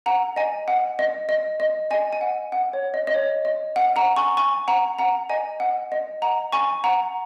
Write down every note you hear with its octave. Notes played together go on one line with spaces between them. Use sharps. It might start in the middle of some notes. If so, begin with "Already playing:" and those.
F#5 A#5
D#5 G#5
F#5
D#5
D#5
D#5
D#5 G#5
G#5
F#5
F#5
C#5
D#5
D#5
C#5
D#5
F#5
F#5 A#5
G#5 C#6
G#5 C#6
F#5 A#5
F#5 A#5
D#5 G#5
F#5
D#5
F#5 A#5
G#5 C#6
F#5 A#5